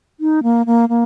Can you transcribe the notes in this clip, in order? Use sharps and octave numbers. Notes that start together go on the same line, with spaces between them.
D#4
A#3
A#3
A#3